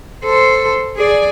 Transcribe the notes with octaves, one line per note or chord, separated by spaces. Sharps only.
A4 C5
G#4 D5